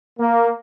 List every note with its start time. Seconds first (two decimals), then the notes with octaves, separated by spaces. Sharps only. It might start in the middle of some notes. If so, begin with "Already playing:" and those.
0.19 A#3